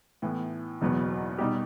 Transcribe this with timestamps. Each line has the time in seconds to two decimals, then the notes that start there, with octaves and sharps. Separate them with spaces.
0.22 A2 E3 B3
0.81 F#1 E2 B2 F#3 B3
1.39 B2 G3 D#4 G4